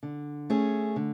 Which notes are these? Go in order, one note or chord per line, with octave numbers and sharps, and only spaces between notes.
D3
A3 C#4 G#4
D3